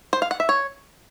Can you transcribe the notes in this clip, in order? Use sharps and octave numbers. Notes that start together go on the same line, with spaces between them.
C5
F5
F#5
E5
C#5